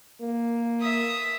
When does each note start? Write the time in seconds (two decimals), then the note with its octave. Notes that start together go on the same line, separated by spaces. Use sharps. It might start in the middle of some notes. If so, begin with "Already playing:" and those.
0.21 A#3
0.81 E5 D#6